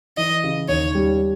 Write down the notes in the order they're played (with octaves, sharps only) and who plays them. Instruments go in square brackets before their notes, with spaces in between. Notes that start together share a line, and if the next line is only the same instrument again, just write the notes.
[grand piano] E3 [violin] D#5
[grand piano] C#3
[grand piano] D#2 [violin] C#5
[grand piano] G3